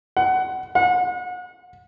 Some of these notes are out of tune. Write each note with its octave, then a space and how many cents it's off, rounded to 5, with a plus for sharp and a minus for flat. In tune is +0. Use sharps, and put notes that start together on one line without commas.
F#5 +20
F#5 -35